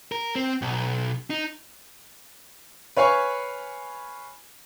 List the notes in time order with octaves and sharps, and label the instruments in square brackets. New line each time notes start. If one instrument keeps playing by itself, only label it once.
[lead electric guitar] A#4
C4
B1
D#4
[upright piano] B4 C#5 F5 G#5 B5 C#6